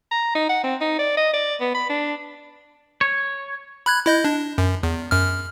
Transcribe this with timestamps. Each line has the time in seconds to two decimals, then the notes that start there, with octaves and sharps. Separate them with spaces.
0.11 A#5
0.35 D#4
0.49 F#5
0.64 C4
0.81 D#4
0.99 D5
1.17 D#5
1.34 D5
1.60 B3
1.75 B5
1.89 D4
3.01 C#5
3.86 B5 F#6 G#6
4.06 E4 D#5 G6
4.25 D4
4.58 F#2
4.83 E2
5.11 F#2 F6